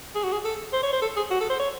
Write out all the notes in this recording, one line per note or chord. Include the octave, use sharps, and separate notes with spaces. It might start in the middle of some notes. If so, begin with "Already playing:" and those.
G#4
F#4
G#4
A4
C5
C#5
C5
A4
G#4
F#4
A4
C5
C#5